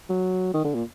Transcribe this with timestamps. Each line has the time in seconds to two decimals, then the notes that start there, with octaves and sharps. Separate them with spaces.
0.10 F#3
0.54 D#3
0.64 D3
0.74 A#2